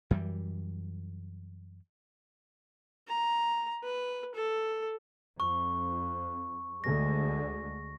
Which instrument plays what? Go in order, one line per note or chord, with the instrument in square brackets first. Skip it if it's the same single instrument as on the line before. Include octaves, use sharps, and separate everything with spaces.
[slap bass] F#2 E3 G3
[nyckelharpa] A#5
B4
A4
[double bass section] F2 [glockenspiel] C#6
[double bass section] D2 D3 G#3 [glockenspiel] A#6